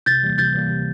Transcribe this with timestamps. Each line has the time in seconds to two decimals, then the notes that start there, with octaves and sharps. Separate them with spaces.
0.06 C3 G6 A6
0.23 E3 G3 A#3
0.38 C3 G6 A6
0.54 E3 G3 A#3
0.70 C3